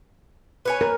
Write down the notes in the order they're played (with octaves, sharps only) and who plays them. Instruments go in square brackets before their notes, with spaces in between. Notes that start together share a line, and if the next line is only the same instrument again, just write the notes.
[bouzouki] B4 C#5 G#5
[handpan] A#4